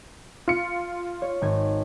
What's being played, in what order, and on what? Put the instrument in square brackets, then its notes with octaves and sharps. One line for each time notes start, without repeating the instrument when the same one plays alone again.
[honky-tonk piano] F4 C#7
[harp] C#5
G#1 G#6